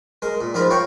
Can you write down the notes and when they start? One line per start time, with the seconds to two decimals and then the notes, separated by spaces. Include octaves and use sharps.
0.22 G#3 A#4
0.41 A#2
0.54 G#2 F3 F4 A#4 B5
0.70 C#5 F5 G5 A#5 C#6